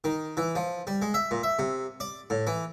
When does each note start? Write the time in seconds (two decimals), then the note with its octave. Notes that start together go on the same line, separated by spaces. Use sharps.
0.04 D#3
0.37 E3
0.55 F3
0.87 G3
1.02 G#3
1.14 E5
1.31 A#2
1.43 E5
1.59 C3
2.00 D5
2.30 A2
2.47 E3